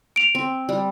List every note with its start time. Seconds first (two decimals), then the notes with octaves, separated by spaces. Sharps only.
0.16 D7 F7
0.35 C4
0.69 G3